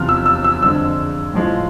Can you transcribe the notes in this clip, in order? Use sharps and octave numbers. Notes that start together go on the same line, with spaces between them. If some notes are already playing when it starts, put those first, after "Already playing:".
Already playing: E2 C3 F3 F6
E6
E6
E6
F2 D3 G#3 E6
A2 F3 G#3